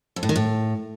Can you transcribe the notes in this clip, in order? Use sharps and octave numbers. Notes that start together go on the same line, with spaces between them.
F2
A2
D#3
A2